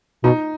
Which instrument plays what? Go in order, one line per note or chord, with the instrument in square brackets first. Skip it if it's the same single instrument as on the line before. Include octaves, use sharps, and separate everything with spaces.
[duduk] B2 [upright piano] D#4